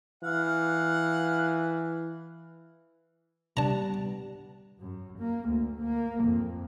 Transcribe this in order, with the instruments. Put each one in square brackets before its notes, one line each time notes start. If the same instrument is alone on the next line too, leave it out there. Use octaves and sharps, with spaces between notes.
[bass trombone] E3 [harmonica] F5 F#5
[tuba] G3 [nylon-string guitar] B3 D4 [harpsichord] A5 A#5
[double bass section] F#2
A#3
D2
A#3
F2